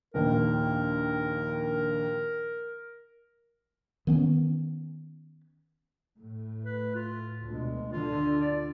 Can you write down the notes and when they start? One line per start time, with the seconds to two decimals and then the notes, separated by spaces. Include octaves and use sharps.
0.14 A#1 D#2 A#4
4.07 D#3 B3 C#4
6.19 A2
6.65 B4
6.95 F4
7.45 D2 B2 G#3
7.92 D3 F4
8.41 D5